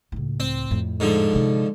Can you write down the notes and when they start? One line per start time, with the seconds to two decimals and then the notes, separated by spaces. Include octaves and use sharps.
0.12 C#2 A2
0.40 C4
0.71 F2 A2
1.00 G#2 D3 F3
1.33 C3 D#3